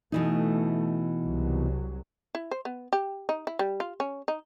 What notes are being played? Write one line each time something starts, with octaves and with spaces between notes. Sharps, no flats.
B2 E3 A3 D#4
C2 F#3
E4
C5
B3
G4
D#4
E4
G3
F4
C#4
D#4